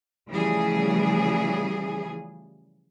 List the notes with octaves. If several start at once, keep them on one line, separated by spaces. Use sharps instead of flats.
C#3 E3 F3 G3 A3 G#4